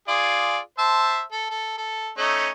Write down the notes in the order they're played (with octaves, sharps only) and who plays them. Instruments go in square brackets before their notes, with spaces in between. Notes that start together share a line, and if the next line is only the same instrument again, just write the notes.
[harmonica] F4 G#4 D5
C5 E5 A5
A4
A4
A4
A3 C#4 D#4